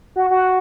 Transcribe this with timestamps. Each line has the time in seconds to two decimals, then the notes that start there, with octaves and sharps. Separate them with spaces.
0.16 F#4
0.30 F#4